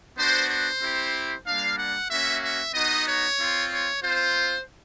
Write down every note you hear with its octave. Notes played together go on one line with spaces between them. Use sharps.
B3 D4 F#4 C5
C5
C4 E4 G4
G3 A#3 D4 F5
F#5
A#3 C#4 F#4 E5
E5
B3 D#4 F#4 D#5
C#5
C4 F4
C#5
C4 F4 C5